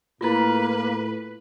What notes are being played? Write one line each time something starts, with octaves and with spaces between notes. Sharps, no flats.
A2 A#3 E4 F4 B4